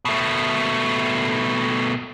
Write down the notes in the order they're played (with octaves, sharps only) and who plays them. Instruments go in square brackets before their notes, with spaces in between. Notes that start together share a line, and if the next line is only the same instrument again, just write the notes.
[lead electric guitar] B2 A3